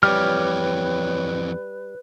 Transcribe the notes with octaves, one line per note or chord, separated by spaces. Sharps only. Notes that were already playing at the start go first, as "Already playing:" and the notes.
F2 E3 G3 B4 C#5 F6